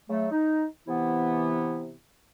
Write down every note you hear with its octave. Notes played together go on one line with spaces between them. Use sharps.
C#3 F#3 A3
D#4
C3 E3 B3 E4